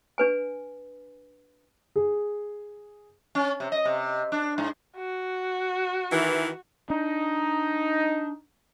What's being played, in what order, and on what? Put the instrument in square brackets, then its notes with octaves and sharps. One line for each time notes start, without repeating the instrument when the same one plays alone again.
[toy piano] D4 B4 G#5
[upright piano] G#4
[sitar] C#4
C3
D#5
C3
D4
G#2
[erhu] F#4
[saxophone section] D#3 E3
[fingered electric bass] D4 [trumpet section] D#4